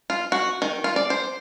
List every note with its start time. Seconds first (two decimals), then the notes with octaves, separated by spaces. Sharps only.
0.10 F4
0.32 F#4
0.62 D#3
0.84 F4
0.96 D5
1.10 C5